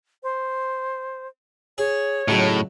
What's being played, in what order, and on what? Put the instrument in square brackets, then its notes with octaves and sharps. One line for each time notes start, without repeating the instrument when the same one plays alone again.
[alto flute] C5
[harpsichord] G#4 [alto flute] C#5
[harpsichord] C#2 F#3 [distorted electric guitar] A2